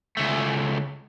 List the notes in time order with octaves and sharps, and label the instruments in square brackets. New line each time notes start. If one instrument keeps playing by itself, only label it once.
[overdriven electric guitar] C#2 A3